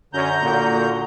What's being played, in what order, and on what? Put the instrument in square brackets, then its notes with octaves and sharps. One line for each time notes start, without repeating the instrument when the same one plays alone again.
[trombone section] F#2 C#4 [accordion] D3 A#5 G6
[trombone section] A#2 A#3 F#4